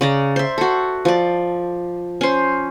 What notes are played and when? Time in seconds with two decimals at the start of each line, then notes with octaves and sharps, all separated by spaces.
0.01 C#3 D5 A#5
0.36 C5 E5
0.58 F#4 A4
1.05 F3 D5
2.21 C#4 C5